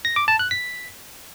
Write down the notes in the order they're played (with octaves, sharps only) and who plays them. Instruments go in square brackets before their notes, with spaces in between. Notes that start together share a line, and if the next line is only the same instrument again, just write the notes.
[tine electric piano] A#6
D6
A5
F#6
B6